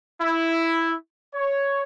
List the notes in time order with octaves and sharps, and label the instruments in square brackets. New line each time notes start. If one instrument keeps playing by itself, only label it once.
[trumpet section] E4
C#5